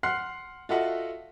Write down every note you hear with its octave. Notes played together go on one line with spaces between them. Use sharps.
F#5 C6 F6 F#6 C7
F4 F#4 A4 D#5 E5 F#5